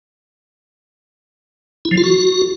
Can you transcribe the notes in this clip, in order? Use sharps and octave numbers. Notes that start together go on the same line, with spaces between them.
E4
F3
F4
F#4